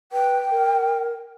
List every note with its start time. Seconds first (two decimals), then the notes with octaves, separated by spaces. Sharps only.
0.12 B4 G5
0.51 A#4